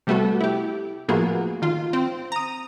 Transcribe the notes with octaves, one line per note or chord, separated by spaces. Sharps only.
C3 G3 A3 B3 F#4 A4
E4 G4
A2 F3 A#3 B3 F#4 G#4
D#3 F4
C4
A#5 D#6